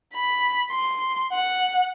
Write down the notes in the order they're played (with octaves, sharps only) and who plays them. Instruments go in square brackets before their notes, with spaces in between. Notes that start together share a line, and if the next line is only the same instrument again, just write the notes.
[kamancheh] B5
C6
F#5